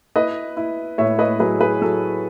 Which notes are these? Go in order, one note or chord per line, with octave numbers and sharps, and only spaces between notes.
E4 B4 D#5
E4
A2 C#5 E5
B4 D#5
F#3 G#4 B4
G#4 B4
F#3 A4